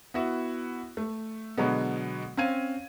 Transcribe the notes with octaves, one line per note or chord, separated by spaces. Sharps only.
B3 E4 F#4
A3
B2 D3 F#3 G#3 B3
C4 C#4 F5 G#6 D#7